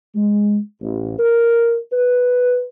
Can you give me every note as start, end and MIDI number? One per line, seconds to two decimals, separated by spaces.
0.15 0.57 56
0.81 1.14 33
1.19 1.77 70
1.92 2.65 71